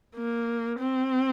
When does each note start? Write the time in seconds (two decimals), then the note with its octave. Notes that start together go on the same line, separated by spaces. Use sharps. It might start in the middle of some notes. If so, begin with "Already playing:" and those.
0.15 A#3
0.79 C4